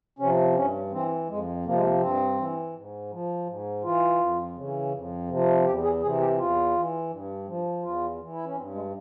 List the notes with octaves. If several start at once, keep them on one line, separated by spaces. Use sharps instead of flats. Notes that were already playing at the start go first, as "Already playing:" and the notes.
C3 F3 C#4
G2 C#4
E3 C4
F2 G#3
C3 F3 A#3
G#3
A#3
G2 C4
E3
G#2
F3
G#2
E3 F4
F2
C#3 E3
F2
C3 F3
E2 G4
G#4
C3 E3 G#4
G4
E2 F4
E3
G2
F3
E2 F4
E3
E4
C#4
G2 C4
G#3